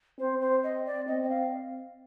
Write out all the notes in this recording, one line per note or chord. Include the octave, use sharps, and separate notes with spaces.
C4 C5
C5
D#5
D5
C4 D#5
D#5
F5